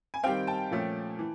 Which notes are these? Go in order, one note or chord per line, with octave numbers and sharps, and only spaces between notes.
G#5
D#3 G3 C4 F5 G5
G5 A5
A#2 F3 A3 C#4
E3